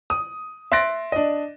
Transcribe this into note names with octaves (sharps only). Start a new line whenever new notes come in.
D#6
E5 C6 F#6 A6 A#6 D7
D4 D#5